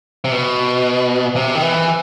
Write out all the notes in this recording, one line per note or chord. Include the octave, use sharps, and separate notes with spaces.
C3
B2
C3
D#3
E3